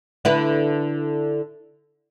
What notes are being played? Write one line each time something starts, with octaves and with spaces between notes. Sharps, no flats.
D3 E4 B4